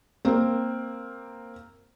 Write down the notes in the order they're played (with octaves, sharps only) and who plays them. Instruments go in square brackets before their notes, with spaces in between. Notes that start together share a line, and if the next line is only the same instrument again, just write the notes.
[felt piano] A#3 C4